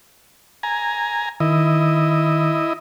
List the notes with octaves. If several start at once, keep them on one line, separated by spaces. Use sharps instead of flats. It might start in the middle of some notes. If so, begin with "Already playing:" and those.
G#5 A#5
D#3 E4 D#5